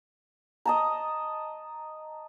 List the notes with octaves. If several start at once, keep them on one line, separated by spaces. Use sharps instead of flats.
D#5 A5 A#5